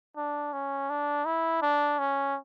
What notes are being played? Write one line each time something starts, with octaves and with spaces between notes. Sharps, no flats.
D4
C#4
D4
E4
D4
C#4